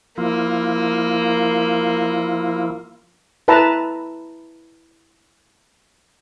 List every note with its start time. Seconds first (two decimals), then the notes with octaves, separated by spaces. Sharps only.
0.18 F3 A#3 E4 F4
3.48 E4 B4 E5 A5 A#5